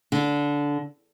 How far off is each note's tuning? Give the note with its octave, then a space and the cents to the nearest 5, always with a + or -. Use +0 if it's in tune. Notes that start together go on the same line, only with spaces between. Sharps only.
D3 -15